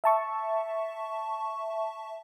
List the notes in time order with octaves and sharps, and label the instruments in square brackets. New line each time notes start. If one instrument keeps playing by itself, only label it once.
[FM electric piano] E5 A5 C#6